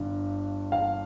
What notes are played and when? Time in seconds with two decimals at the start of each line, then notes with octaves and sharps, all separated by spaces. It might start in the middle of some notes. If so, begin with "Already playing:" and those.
Already playing: G1 G2
0.72 F5